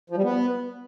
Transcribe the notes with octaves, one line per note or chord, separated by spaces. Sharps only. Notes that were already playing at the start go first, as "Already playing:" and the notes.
F3
G3
B3